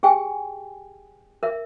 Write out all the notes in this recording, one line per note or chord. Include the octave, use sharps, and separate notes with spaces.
G4 G#4 G5 G#5
A#4 E5